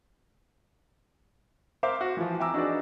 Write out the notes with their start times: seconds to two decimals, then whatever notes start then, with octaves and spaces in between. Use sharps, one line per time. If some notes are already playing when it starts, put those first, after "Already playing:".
1.83 A#4 C5 E5 F5 D6
2.01 F#4
2.17 E3 F3
2.40 E5 G5 G#5 A#5 D6 E6
2.54 D4 D#4 F#4 G#4 B4 D5